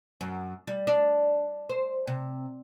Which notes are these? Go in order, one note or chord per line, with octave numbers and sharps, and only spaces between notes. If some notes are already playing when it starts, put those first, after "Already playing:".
F#2
G3
D4
C5
C3